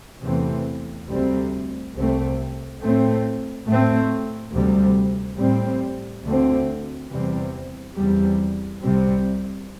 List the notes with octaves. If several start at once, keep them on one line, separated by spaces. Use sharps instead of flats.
E2 C3 E3 A3 C4
D2 C3 G3 C4
C2 C3 A3 C4
A2 A3 C4
A2 A3 C4
D2 C3 G3
A2 G3 C4
D2 D3 A3 C4
E2 C3 E3 G3 C4
E2 C3 G3
C2 C3 G3 C4